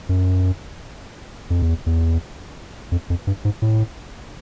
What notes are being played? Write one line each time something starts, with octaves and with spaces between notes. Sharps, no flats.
F#2
F2
E2
E2
F2
F2
G2
G#2
A2